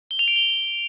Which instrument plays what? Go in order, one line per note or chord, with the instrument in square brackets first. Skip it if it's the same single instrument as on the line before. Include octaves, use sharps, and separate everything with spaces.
[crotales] G7
F7
D7
G7